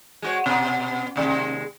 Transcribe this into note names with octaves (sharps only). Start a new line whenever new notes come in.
G#3 F#4 C#5
B2
D#2 C3 G#3